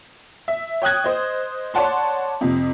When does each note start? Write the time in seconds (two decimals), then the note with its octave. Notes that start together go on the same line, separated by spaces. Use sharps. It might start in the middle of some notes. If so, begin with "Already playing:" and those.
0.48 E5
0.82 C#5 G5 D#6 F#6 G#6
1.04 C5 D#5
1.74 C#5 D5 F#5 A5 C6
2.41 F2 C3